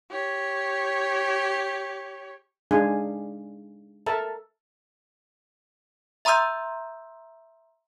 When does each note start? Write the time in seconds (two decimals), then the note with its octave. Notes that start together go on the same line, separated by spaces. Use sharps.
0.10 G4 C#5
2.71 G#3 D4 D#4 G#4 F5 G#5
4.06 A4 A#4 E5 A5
6.25 E5 A#5 C6 D#6 E6 G6